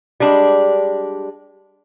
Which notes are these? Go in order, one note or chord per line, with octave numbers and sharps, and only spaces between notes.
G3 G#3 D4